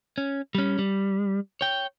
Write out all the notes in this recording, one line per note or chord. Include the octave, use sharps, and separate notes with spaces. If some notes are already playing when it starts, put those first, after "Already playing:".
C#4
G3 C#4
G3
C#5 G5